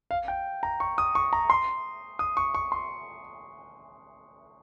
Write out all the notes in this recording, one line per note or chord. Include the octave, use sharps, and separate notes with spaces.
F5
G5
A#5
C#6
D#6
C#6
A#5
C6
D#6
C#6
C#6
C6